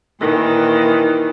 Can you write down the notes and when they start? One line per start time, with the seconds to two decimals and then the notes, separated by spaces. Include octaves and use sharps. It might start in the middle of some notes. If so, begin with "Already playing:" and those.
0.21 A#2 D#3 E3